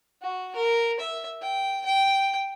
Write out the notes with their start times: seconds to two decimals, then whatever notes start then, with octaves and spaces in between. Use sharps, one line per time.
0.22 F#4
0.56 A#4
1.00 E5
1.42 G5
1.86 G5